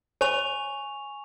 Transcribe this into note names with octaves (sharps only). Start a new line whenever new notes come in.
C#5 G#5 C#6 F7